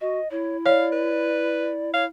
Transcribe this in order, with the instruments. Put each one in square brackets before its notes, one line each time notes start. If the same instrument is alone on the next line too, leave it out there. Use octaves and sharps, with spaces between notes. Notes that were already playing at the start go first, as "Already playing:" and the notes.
[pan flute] F#4 [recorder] D#5
[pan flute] E4 [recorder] C#5
[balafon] C#5 [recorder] D5 [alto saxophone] F5
[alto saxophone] B4
[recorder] C#5 [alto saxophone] F5